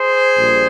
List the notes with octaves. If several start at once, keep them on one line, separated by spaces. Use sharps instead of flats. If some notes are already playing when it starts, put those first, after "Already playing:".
Already playing: G#4 C5
A#1 A#2 G3